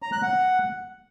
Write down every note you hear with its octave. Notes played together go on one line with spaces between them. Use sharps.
A#5
F#6
F#5